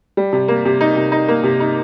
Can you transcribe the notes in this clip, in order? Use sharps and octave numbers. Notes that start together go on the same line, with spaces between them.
G3
C3
A#3
C3
D#4
C3
D#4
A#3
C3
D#4